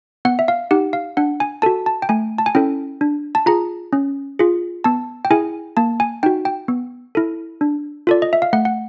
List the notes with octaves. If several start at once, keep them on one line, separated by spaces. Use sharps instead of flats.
B3 F#5
E5
F5
D#4 G4 F#5
F5
D4 F#5
G#5
F#4 A4 A5
A5
G5
A3 G#5
A5
G#5
C#4 E4 A4 G5
D4
A5
F4 G#4 A#5
C#4
F4 G#4
B3 A5
G5
E4 G#4 G#5
A#3 A5
G#5
D#4 F#4 G5
G5
B3
E4 A4
D4
F4 A4 D5
D#5
E5
F5
A3 F#5
F#5